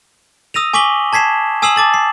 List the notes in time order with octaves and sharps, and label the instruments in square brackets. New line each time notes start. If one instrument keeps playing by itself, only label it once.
[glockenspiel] D#6 E6 A#6 D#7 F7
G#5 C#6 D6 B6 F#7 G7
A5 G#6 B6 C7 E7
G#5 D#6 E6 C7 E7 F#7
A5 D6 A6 F#7
C7